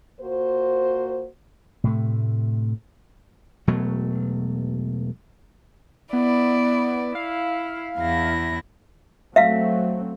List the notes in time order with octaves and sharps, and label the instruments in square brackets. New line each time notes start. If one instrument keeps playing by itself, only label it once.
[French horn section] A#2 A#3 F#4 C5
[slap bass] A2 C3 A3
E1 B2 F#3 A3
[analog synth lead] B3 [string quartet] E4 D5
[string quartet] E4 [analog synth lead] F5
[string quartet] E2 E4 A#6
[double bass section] F#3 A3 C4 [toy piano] E5 F5